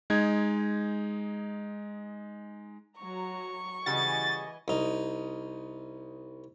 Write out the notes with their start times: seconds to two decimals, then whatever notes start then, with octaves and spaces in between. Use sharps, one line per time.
0.10 G#3 D#4 G#6
2.98 F#3 A#5 C#6
3.86 C#3 E3 G3 F#4 D#5 G#5 A6
4.68 C2 D#4